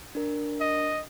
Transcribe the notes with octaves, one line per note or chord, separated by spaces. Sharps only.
D4 A#4
D#5